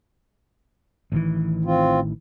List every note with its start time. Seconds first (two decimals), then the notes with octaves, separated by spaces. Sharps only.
1.12 A1 D#3 E3
1.65 C4 F4